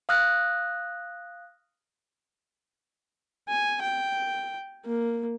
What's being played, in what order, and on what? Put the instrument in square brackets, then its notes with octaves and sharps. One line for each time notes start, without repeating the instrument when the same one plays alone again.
[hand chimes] F5 D#6 F6 F#6 A#6
[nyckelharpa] G#5
G5
A#3